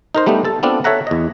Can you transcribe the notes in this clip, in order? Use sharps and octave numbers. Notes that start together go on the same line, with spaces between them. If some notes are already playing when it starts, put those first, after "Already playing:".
D#4 A#4 C5
G3 A3 B3 D4 D#4
A4 A5
B3 C4 D4 F4 A4
A4 C#5 E5 F#5 A#5
E2 D#5